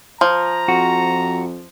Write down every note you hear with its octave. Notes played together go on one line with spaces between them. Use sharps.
F3 A#5
F2 F#4